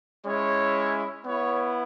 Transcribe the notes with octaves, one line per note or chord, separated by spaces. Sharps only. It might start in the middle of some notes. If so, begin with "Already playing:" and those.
G#3 C#4 E4 C#5
B3 E4 C#5